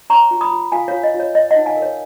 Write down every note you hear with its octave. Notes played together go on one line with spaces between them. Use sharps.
C#5 A#5 C#6
F4
B5 D#6
F4
F4 F5 G#5
F4 C#5 F5
D#5
F4
C#5
C#5 D#5
D#4 D#5 F#5
F5 G#5
A#4
C#5